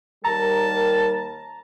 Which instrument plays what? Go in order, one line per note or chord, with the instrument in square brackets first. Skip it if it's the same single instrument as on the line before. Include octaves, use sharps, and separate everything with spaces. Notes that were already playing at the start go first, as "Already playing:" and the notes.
[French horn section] D#2 G3 A#4 [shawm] A5 [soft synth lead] A#5